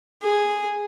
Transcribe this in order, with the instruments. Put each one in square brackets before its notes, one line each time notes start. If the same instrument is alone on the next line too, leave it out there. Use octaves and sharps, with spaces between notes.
[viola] G#4